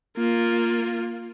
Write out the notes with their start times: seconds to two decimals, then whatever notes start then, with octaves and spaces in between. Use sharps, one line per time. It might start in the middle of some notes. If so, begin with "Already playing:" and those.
0.17 A#3 F4